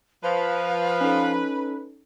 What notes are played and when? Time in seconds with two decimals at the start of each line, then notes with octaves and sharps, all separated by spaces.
0.23 F3 B4 F5
1.01 C#4 D#4 A4